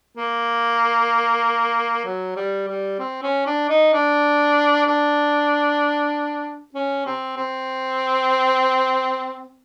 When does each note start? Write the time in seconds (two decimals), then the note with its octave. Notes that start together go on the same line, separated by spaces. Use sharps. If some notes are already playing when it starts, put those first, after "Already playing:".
0.17 A#3
2.05 F#3
2.36 G3
2.68 G3
2.99 C4
3.23 C#4
3.46 D4
3.69 D#4
3.93 D4
4.87 D4
6.74 C#4
7.06 C4
7.37 C4